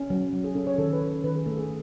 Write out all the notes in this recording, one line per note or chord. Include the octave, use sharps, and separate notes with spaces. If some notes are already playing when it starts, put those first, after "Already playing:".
Already playing: C#4
F#3
F#3
G#4
C#4 A4
C#5
D#3 A4
B4
C#4
D#3 B4
G#4
A3 A4
G#4